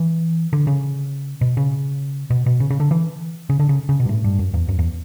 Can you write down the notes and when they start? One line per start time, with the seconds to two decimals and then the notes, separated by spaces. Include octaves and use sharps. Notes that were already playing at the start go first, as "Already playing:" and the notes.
Already playing: E3
0.53 D3
0.67 C#3
1.41 B2
1.57 C#3
2.30 B2
2.46 B2
2.60 C#3
2.70 C#3
2.80 D3
2.91 E3
3.50 C#3
3.59 D3
3.69 C#3
3.89 C#3
4.00 B2
4.05 G2
4.09 A2
4.24 G2
4.39 F#2
4.54 E2
4.69 F#2
4.79 E2